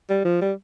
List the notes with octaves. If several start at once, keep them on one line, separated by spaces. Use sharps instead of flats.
G3
F3
G3